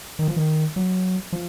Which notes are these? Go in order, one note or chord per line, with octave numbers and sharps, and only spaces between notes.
D#3
F3
D#3
F#3
F3